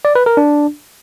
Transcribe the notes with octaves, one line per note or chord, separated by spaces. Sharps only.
D5
B4
A#4
D4